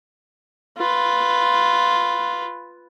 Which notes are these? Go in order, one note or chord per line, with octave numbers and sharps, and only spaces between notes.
F4 B4